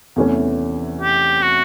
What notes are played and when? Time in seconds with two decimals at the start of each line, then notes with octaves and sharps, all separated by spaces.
0.16 E2 C3 E3 A3 C#4
1.01 G4
1.43 F#4